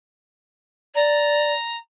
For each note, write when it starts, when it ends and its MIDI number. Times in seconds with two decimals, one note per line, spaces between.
0.95 1.53 74
0.95 1.77 82